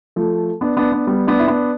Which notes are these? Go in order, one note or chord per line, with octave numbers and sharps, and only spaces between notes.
F3 A3
B3 D4
B3 D4
B3 D4
G3 B3
B3 D4
E4
B3 D4